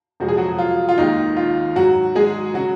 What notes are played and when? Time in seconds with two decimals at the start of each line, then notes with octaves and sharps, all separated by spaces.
0.20 F2 C3 F3 G#3 F#4
0.28 G#4
0.37 F#3 F#4
0.59 F4
0.89 F4
0.98 D#2 D#3 G#3 D#4
1.37 F4
1.76 G#2 F#3 F#4
2.15 G#3 G#4
2.54 C#3 F#3 G#3 F#4